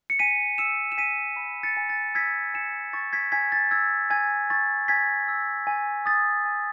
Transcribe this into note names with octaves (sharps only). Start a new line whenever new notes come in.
C#7
G#5 B6 D#7
E6 C#7 E7
E7
G#5 B6 D#7
B5
A6 C#7
G#5
A6
E6 G#6 B6
G#5 C#7 E7
C#6 A6
G#6 B6
G#5 G#6 B6
A6
E6 G#6
G#5 G#6
C#6 A6
G#5 G#6 B6
E6
G#5
D#6 A6
G#5